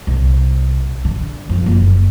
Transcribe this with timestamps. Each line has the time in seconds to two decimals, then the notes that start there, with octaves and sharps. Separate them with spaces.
0.07 C2
1.05 D3
1.49 F2
1.66 F#1